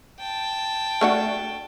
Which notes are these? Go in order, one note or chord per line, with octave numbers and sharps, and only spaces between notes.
G5 A5
A3 D4 F#4